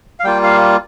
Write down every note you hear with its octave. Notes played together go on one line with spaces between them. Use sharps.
F5
G3 A#3 F4 G5
F5